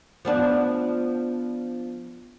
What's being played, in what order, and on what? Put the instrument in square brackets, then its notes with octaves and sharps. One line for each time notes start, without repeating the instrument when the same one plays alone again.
[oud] F3 B3 D4